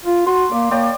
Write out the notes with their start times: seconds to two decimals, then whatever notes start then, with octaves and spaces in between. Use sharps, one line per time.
0.05 F4
0.26 F#4 C6
0.51 A#3 D5
0.71 A#3 C#5 D5 G5